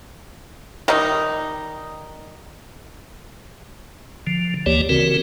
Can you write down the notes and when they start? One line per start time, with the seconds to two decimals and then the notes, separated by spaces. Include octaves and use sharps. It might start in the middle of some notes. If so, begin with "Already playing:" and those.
0.88 D#3 G3 D#4
4.27 D3 F3
4.66 D2 E3 A#3 G4 C#5 D5
4.89 C#3 E3 C4 F#4 A#4